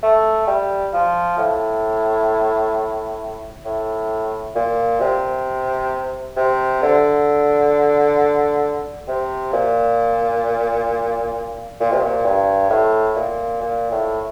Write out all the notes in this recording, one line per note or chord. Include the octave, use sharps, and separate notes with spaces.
A3
G3
F3
A2
A2
A#2
C3
C3
D3
C3
A#2
A#2
C3
A#2
G2
A2
A#2
A#2
A2